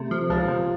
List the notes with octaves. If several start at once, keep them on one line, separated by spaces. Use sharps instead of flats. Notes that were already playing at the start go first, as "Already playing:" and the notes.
Already playing: C3 A3
F3
C#2 F3
C3